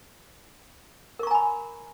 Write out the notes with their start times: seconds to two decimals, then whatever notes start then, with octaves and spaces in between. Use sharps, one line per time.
1.19 A#4
1.23 C#6
1.27 A#5
1.31 G#5
1.35 B5